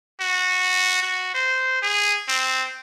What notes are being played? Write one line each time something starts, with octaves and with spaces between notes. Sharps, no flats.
F#4
F#4
C5
G#4
C4